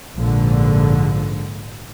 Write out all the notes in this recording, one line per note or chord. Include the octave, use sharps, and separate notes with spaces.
A#1 G#2 D3